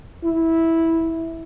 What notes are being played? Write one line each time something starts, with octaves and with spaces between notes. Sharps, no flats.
E4